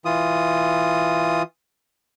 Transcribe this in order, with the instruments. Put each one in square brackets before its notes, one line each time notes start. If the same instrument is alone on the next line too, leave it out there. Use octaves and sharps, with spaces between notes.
[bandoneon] E3 F4 D#6